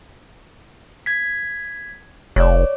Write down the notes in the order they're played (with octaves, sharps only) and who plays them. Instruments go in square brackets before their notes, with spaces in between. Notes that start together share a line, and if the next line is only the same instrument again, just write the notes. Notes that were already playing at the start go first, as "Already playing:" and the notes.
[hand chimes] G#6 B6
[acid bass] F1 [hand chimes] C#5 D5